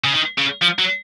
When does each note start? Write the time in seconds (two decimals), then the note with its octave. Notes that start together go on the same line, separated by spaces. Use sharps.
0.04 C#3
0.14 D#3
0.38 C#3
0.62 F3
0.79 F#3